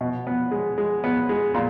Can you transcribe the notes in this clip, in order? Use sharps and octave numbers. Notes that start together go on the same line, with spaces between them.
B2
B3
G#3
G#3
B3
G#3
A#2